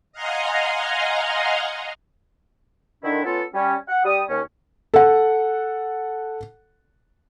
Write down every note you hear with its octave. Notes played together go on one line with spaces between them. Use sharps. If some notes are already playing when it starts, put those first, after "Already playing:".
D#5 F5 F#5 G#5 A#5 C6
D3 D#3 D4 E4
B3 C#4 F4 A4
G3 C#4
F#5
G3 D#6
D#2 C#4
A4 F#5